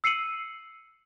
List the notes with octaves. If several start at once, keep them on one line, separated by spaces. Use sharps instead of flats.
E6 C7 C#7 D#7 F#7